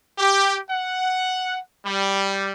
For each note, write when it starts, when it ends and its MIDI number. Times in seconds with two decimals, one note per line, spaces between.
0.19 0.57 67
0.70 1.58 78
1.85 2.53 55